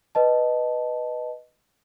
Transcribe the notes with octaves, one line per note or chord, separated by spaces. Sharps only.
B4 D#5 A5